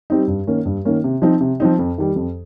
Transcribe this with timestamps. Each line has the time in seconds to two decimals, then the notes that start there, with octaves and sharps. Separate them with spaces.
0.10 G3 C4 D#4
0.28 G2
0.47 D#3 A#3 C#4
0.65 G2
0.85 D#3 A#3 C#4
1.04 C3
1.22 F3 C4 D#4
1.41 C3
1.60 F3 C4 D#4
1.79 F2
1.98 D#3 G3
2.16 F2